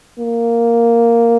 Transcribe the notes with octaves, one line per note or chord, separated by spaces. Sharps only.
A#3